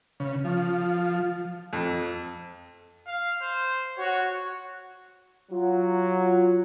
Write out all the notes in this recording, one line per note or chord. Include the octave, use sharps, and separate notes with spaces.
C#3
F3
F2
F5
C5
F#4 C#5
F#3 F4